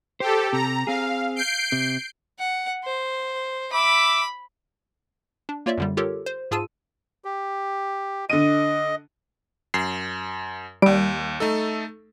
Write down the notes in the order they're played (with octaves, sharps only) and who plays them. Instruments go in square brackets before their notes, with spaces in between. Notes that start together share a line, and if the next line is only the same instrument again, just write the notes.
[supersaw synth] G4 A4 [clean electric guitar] C5
[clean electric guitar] C3 [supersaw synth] A#5
[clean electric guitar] C4 G#4 [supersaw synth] F5
[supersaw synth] G6 C7 D7
[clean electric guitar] C3
[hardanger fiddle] F#5
C5
[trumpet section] E5 D6 [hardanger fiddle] B5
[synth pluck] D4
A#3 F4 C#5 D5 E5
F#2 D3 G3
F4 G4 A4 A#4 C#5
C5
G#2 F4 G#4 A5 E6 D#7
[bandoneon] G4
[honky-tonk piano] D3 D#7 [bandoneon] D#5
[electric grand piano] F#2 [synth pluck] C7
[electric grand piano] D#2 D7 [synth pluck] G3
[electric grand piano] A3 D#4 A4